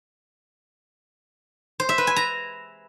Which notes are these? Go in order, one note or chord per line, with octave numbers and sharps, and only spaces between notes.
C5
E5
B4
G#5
A#5